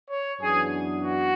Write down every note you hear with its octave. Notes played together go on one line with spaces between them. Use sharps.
C#5
F#2 E3 B3 D4 G#4
F#4